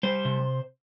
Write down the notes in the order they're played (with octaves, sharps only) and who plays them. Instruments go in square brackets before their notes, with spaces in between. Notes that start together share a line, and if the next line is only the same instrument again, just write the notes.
[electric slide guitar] G3 C5
C3